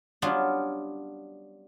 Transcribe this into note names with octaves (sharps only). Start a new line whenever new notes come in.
F#3 G3 B3 C#4 D4 F4